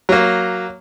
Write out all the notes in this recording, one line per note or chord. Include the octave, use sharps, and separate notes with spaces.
F#3 A#3